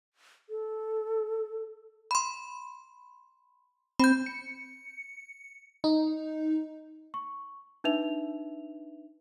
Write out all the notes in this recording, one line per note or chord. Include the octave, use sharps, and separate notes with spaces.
A4
B5 C6
C4 B5 G6
C#7
D#4
C#6
D4 D#4 B4 E5 F7